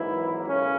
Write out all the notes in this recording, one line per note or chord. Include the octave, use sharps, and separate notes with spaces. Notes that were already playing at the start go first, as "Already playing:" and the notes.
Already playing: G#1 G#2 D#3 E3 F#3 A#3 E4
B1 C#3 C#4